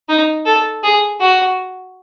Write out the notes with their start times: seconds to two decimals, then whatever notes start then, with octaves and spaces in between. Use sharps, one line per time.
0.09 D#4
0.46 A4
0.83 G#4
1.20 F#4